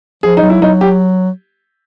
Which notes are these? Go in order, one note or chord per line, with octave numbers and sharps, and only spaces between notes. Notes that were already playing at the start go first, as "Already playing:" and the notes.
F3 G#4
D#4
F#3
E4
F#3 D#4
G4